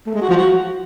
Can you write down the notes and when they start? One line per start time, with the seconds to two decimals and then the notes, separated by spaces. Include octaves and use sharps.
0.07 A3
0.14 G#3
0.22 F#4
0.29 F3
0.36 F#4